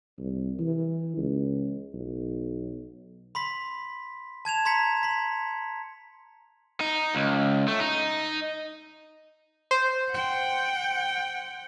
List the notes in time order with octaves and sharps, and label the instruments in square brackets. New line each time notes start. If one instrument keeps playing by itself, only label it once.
[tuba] C2
E3
C#2
B1
[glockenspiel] B5 C6 B6
A5 G#6 E7 F7
A#5 C6 G#6 B6 C#7
C6 B6
[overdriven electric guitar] D#4
C#2
A3
D#4
[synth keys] C5
[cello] F#5 G5